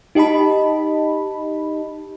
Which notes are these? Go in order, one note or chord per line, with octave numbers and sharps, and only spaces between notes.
D#4 G4 D#5 A5 B5